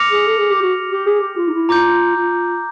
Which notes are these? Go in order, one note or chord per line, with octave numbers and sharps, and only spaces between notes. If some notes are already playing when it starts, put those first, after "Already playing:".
Already playing: D6 F6 A#6 C#7 F7
G#4
A4
G#4
G4
F#4
G4
G#4
G4
F4
D#4
E4
F4 A#5 D6 G6
F4